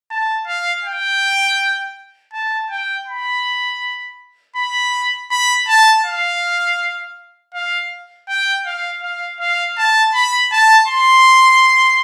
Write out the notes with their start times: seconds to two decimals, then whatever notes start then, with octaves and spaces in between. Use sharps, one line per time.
0.11 A5
0.48 F5
0.84 G5
2.33 A5
2.71 G5
3.08 B5
4.56 B5
5.31 B5
5.68 A5
6.05 F5
7.54 F5
8.29 G5
8.66 F5
9.03 F5
9.40 F5
9.78 A5
10.14 B5
10.52 A5
10.88 C6